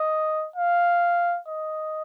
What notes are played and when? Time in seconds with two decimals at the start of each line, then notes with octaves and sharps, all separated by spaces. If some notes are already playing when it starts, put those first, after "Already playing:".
Already playing: D#5
0.56 F5
1.48 D#5